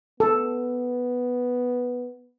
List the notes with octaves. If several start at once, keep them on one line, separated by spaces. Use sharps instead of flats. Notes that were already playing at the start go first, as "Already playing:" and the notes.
B3 A4